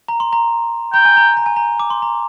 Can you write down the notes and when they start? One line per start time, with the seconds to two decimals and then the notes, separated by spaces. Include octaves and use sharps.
0.08 A#5
0.20 C6
0.33 A#5
0.94 G5 A#5
1.05 G#5
1.17 A#5
1.37 A#5
1.46 G#5
1.56 A#5
1.80 D6
1.90 C6
2.02 A#5